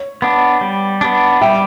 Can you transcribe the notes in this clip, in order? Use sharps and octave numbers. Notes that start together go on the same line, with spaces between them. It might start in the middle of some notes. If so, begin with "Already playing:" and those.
Already playing: C#5
B3 D4
G3
B3 D4
G3 E5 G5